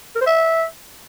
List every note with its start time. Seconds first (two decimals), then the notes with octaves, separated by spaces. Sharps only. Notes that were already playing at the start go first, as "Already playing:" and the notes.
0.16 A#4
0.21 C5
0.27 E5